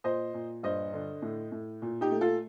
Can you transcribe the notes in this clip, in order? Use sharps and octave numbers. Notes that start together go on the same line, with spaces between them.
A#2 C5 D#5
A#2
G2 C5 D#5
D3
A2
A2
A#2
D#4 G4
A3
F4 A4